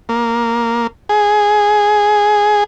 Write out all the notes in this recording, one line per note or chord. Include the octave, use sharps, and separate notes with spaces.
A#3
G#4